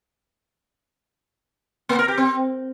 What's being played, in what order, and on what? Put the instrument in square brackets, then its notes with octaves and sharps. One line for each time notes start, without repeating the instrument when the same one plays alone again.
[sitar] A#3
A#4
G4
C4